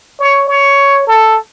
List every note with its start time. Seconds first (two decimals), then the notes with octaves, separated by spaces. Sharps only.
0.20 C#5
0.48 C#5
1.07 A4